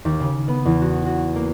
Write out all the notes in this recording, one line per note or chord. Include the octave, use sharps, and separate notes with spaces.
D#2
C#3
B3
E2
F#4
F#4
A#3